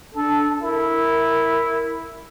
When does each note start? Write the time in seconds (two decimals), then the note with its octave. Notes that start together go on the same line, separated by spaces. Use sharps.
0.15 D4 A4
0.61 E4 A#4